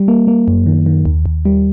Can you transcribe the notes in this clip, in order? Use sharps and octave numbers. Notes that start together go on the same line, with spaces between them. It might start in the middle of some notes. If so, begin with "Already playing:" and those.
Already playing: G3
A#3
A#3
F#2
D#3
D#3
D#2
D#2
G3